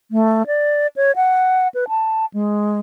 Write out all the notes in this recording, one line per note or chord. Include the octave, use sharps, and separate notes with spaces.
A3
D5
C#5
F#5
B4
A5
G#3